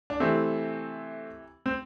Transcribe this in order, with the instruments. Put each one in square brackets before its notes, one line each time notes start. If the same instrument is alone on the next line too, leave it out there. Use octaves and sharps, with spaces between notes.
[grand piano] D4
C3 E3 A3 C4
C4